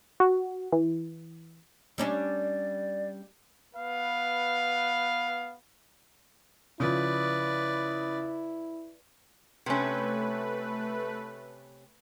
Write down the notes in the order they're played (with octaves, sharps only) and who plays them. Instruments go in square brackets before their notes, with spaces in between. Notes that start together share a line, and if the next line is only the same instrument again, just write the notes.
[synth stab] F#4
E3
[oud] G3 C#4 D4 [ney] D5
[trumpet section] B3 B4 F5
[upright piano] C#3 F3 [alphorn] E4 [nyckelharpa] B4 D5
[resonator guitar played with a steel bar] C3 C#4 [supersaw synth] A3 B4